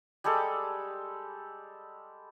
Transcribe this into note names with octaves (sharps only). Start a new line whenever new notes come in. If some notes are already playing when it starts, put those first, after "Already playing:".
G3 G#3 G4 A4